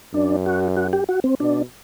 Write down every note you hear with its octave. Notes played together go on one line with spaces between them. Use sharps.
F#2 D4
F#4
F#4
G4
F#4
C4
B2 D4